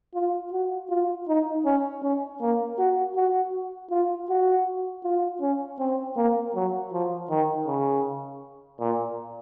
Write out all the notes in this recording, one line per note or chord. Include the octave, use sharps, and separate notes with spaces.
F4
F#4
F4
D#4
C#4
C#4
A#3
F#4
F#4
F4
F#4
F4
C#4
C4
A#3
F#3
F3
D#3
C#3
A#2